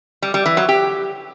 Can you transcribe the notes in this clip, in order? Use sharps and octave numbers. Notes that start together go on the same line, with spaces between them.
G3
G3
E3
F#3
G4